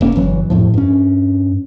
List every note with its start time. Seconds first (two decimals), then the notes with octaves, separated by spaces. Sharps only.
0.01 F1 A#3 C#4
0.16 G1 E3 F#3
0.50 F2 A2 F3
0.74 G2 C#4